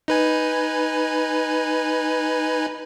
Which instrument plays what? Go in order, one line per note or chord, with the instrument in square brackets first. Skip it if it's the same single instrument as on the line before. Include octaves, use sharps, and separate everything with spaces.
[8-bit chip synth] D#4 B4 G#5